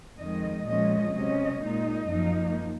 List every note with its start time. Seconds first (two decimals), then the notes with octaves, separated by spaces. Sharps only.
0.19 F2 D#3 G#3 D#5
0.67 A#2 F3 G#3 C#4 D#5
1.14 C3 F#3 C#4 D#5
1.62 A#2 G#3 D#4 D#5
2.10 F#2 F3 A#3 D#4